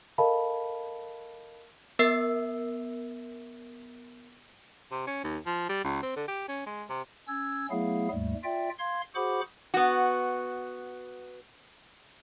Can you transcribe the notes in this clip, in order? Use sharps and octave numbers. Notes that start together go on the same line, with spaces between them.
A4 A#4 D#5 F5 A5 B5
B3 A#4 E5 E6 C7
C3
C#4
D#2
F3
G3
C#2
C4
D3
G4
C#4
G#3
C3
C#4 E6 G#6
F#3 A3 B3 E4 G#4 F5
D#2 G#2 G3 A3
F4 D5 E5 G5
F5 C6 G#6
F#4 G#4 C5 F#5 B5 D6
B3 F#4